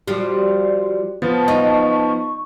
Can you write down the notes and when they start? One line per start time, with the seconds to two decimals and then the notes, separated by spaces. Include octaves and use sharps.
0.07 F3 G3 F#4 D5
1.22 F3 B3 A5
1.48 D#4 C#6